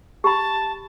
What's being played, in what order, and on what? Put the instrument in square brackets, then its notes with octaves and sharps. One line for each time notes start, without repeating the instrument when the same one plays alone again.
[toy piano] G4 B5 [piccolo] A5